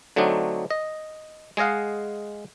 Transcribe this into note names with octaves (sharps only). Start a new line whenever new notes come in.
D3 F#3 A3 C4 D4 D#4
D#5
G#3 G#4 D#5 F5 F#5